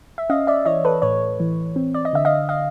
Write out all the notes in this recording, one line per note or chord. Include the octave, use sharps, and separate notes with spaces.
E5
C#4 D#5 F5
D5 E5
E3 C#5 D#5
A4 B4
A2 B4 C#5
E3
C4
D5
D#5
D3 E5
D#5 F5
D#5 F5